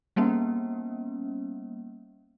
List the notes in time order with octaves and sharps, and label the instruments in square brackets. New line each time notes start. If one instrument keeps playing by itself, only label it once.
[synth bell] G3 A#3 B3 C#4